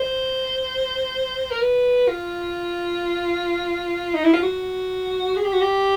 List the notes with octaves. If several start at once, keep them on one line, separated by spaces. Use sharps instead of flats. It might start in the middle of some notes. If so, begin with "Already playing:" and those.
Already playing: C5
A#4
B4
F4
D#4
E4
F4
F#4
G#4
G4
F#4
G4